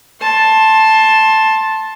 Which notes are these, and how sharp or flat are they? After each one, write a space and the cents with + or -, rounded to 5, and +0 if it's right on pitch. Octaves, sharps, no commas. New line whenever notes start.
A5 +0 C6 +20